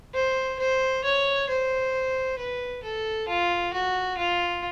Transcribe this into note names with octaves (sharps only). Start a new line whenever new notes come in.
C5
C5
C#5
C5
B4
A4
F4
F#4
F4